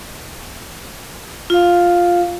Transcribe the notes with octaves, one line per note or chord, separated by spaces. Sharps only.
F4 F5